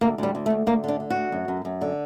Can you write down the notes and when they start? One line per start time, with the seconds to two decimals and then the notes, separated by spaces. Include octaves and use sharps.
0.01 D2 A#3
0.18 D2 G3
0.35 D2
0.46 A3
0.50 D2
0.66 D2 A#3
0.84 D3 D4
1.00 D3
1.10 F#4
1.16 D2
1.32 F#2
1.48 F#2
1.65 F#2
1.81 D3